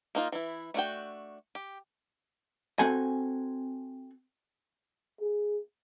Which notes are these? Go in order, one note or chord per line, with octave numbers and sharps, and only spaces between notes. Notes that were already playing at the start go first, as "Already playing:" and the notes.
A#3 D#4 F4
E3 E4
A3 D4 F#4 G5
G4
C4 F#4 A4 G#5
G#4